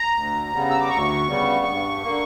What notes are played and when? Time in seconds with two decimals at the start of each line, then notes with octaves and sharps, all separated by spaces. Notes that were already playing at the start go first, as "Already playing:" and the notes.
Already playing: A#5
0.14 D2
0.52 C#3 G3 B3
0.70 E6
0.80 D6
0.89 D2 C#6
1.27 C#3 G3 B3
1.65 G2
2.03 D3 A#3